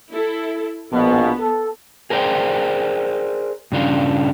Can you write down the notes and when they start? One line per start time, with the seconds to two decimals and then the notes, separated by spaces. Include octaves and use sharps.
0.12 E4 A4
0.92 A#1 B2 B3
1.39 A4
2.10 G#4 A#4 C5 D5 G5
3.72 G2 C#3 D4 F4